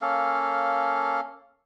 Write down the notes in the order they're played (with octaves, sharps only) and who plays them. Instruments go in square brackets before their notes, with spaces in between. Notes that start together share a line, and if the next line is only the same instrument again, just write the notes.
[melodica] A#3 C#4 A4 F5